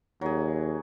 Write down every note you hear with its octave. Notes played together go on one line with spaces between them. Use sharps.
D#2 F#3 G#4